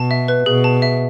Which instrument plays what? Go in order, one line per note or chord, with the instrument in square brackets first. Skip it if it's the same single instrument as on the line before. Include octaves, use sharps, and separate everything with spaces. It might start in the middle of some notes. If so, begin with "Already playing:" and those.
Already playing: [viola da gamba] B2 [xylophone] A5
[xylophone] E5
B4
[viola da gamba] B2 [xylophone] G#4
[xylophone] A5
E5